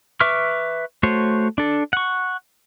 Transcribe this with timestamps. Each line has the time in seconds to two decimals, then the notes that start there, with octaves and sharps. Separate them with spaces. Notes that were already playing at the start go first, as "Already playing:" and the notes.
0.20 B4 E5 C#6 D6 F6
1.03 A3 F#4 C5 C#5
1.58 D4 A4
1.93 F#5 C#6